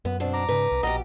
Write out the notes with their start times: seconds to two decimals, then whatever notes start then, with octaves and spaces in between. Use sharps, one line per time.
0.05 F#2 B3
0.20 B2 C4 D4
0.33 A#5 D6
0.49 G#2 C#3 B4
0.71 C2
0.83 A#1 B2 G4 D#5 A#5 D#6